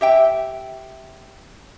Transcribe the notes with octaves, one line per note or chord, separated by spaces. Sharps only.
G4 E5 G5